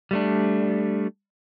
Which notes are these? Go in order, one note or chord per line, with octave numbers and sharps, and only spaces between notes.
G3 A3 D4